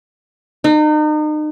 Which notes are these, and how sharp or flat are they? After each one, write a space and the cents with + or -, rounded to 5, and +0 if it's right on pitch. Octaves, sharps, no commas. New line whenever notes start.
D#4 -35